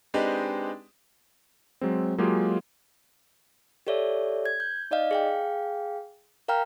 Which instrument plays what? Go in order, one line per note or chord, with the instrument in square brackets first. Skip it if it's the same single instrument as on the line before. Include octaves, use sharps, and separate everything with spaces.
[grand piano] G#3 C4 D4 D#4 G4 B4
[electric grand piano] F#3 G#3 C4
F#3 G#3 A#3 F4 G4 G#4
[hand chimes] G4 A4 C#5 D5 E5
G#6
G6
D#4 D5 D#5 F5
G#4 F5 G5
A#4 F5 G5 A#5 F6